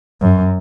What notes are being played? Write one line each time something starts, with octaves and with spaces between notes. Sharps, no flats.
F#2